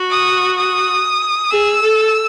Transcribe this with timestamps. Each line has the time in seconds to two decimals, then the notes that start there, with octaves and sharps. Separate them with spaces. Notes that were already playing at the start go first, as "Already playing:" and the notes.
Already playing: F#4
0.10 D#6
0.57 D#6
1.50 G#4 E6
1.82 A4